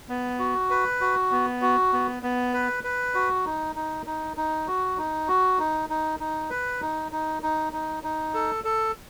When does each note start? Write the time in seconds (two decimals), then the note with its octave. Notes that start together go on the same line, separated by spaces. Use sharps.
0.09 B3
0.39 F#4
0.70 B4
1.01 F#4
1.31 B3
1.62 F#4
1.93 B3
2.23 B3
2.53 B4
2.84 B4
3.14 F#4
3.45 D#4
3.76 D#4
4.06 D#4
4.37 D#4
4.67 F#4
4.98 D#4
5.28 F#4
5.59 D#4
5.90 D#4
6.20 D#4
6.50 B4
6.81 D#4
7.12 D#4
7.43 D#4
7.73 D#4
8.04 D#4
8.34 A4
8.64 A4